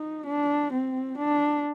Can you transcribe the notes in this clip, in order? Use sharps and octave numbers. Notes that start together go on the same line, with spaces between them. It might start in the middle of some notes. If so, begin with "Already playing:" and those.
Already playing: D#4
D4
C4
D4